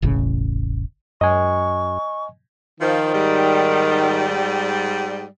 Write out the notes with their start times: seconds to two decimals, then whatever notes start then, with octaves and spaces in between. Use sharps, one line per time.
0.02 E1 A1 A2 C#3
1.21 F#2 D#5 G#5 C#6
2.80 D#3 F3
3.13 G#2 G3